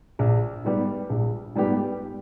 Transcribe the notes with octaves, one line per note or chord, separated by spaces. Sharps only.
A#1
G#2 G3 B3 G4
A#1
G#2 G3 B3 G4